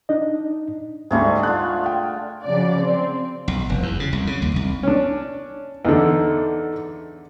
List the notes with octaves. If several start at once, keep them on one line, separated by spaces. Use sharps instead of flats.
D4 D#4 D#5
D2 G#2 G3 A3 G#4
D3 F4 F#6
G5
C#3 F3 F#3 D5
C4
B1
F1
E2
C#3
C2
C#3
D#2
C2
C#4 D4
E2 D3 D#4 A4